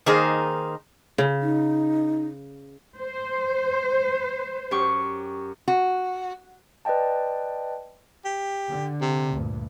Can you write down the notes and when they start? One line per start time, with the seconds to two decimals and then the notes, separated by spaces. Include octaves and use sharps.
0.06 D#3 A#3 D#4 G#4 C5
1.18 C#3
1.42 D#4
3.00 C5
4.71 F#2 G4 C#6
5.68 F#4
6.85 B4 D5 D#5 G5 A5
8.25 G4
8.69 D3
9.01 C3
9.33 D2 G2 A#2